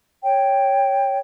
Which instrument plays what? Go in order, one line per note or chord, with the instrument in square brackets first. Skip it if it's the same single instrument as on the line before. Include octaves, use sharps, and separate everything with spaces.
[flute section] C#5 G5